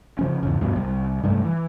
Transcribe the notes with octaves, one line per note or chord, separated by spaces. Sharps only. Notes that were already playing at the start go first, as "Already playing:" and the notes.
C#3 F3 C#4
E2 G#2 C#3
D2 G2 B2 F3
C2 G3
G2 C3 G3 A3
E3